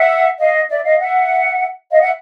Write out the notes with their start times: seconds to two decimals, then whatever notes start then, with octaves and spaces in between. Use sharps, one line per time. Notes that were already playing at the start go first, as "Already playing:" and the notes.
Already playing: E5 F#5
0.39 D#5 F5
0.69 D5 E5
0.84 D#5 F5
0.99 E5 F#5
1.91 D#5 F5
2.01 E5 F#5